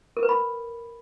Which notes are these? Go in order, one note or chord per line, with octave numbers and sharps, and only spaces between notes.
A#4
B4
B5